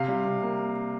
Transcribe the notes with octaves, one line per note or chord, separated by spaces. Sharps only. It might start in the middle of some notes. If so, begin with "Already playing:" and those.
Already playing: C3 F5
G3
C3
A#3